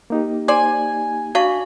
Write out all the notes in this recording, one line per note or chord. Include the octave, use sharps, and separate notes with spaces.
A#3 D#4 G4
C5 D5 G#5
D4 F#4 F5 C#6